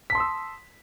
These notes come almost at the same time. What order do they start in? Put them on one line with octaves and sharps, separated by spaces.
B6 A5 C6 D#6 E6